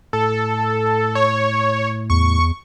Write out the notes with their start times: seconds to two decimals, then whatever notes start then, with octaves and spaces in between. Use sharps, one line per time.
0.13 A2 A4
1.15 C#5
2.10 E2 C#6